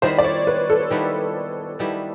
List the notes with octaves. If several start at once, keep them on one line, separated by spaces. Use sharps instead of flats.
D#3 G3 B3 E4 C5
D5
C#5
B4
A4
D#3 G3 B3 E4
D#3 G3 B3 E4